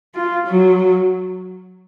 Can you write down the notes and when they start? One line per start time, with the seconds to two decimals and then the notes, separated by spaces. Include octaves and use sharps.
0.15 F4
0.48 F#3